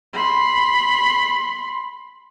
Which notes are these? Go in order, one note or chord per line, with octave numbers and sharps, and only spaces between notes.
B5 C6